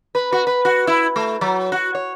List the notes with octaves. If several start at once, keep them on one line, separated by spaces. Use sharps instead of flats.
B4
F#4
B4
F#4
E4
A3
F#3
F#4
C#5